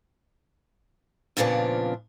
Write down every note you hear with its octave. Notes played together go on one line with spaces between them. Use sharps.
F2 A#2 C#3 F3 B3 D4